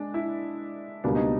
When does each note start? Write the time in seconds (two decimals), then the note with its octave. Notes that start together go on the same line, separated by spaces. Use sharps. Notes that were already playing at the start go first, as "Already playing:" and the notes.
Already playing: G#3 D4
0.14 E4
1.04 C#2 B2 G3 A#3 D4
1.15 D#4